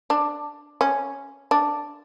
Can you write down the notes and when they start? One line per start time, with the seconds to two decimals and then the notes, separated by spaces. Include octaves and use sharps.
0.10 D4
0.81 C#4
1.51 D4